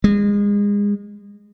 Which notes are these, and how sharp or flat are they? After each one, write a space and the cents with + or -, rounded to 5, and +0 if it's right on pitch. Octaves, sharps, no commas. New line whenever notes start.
G#3 -30